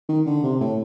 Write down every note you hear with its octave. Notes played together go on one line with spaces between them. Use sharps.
D#3
D3
C3
A2